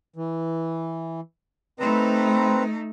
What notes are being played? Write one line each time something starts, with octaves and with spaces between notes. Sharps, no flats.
E3
A3 C4 D#4 B4 A#5